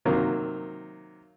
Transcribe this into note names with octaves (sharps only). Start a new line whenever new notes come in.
C3 D#3 F#3 A#3